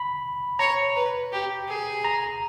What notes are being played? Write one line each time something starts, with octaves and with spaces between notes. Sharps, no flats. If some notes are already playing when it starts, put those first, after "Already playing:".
Already playing: B5
C#5 A#5
B4
G4
G#4
A#5